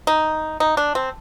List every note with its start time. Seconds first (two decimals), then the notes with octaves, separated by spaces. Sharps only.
0.07 D#4
0.60 D#4
0.77 D4
0.95 C4